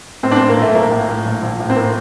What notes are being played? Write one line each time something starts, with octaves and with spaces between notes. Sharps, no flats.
A2 C4
D4
A2 C4
A#3
A#1 A3
A#1 A#3
A2
A2
A#1
A#1
A2
C4
A2 A#3